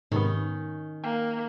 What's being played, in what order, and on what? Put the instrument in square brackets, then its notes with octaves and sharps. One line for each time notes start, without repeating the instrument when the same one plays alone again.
[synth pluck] G#2 C3 B3 [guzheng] D#3 C#4 D#4
[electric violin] A#3 [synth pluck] G5